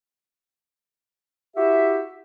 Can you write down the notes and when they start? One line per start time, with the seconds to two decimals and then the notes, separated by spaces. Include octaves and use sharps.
1.56 E4 F#4 G4 E5